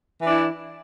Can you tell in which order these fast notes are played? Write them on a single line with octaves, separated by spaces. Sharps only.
E3 D4 E4